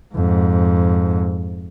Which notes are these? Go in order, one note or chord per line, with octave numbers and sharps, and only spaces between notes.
F2 G#2